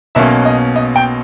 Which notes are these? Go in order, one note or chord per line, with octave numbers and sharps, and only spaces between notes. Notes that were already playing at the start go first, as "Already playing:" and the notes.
B1 B2 A#3 C#4 E5
D#5
D#5
G5